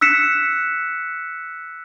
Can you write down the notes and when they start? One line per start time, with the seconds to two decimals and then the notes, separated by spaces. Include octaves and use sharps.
0.01 E6 F#6 B6 C#7 E7